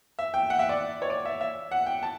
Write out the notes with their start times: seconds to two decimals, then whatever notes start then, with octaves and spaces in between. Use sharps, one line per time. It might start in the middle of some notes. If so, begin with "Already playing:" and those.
0.19 E5
0.34 G5
0.50 F#5
0.59 E5
0.69 D5
1.02 C#5
1.10 D5
1.25 E5
1.41 E5
1.71 F#5
1.86 G5
2.03 A5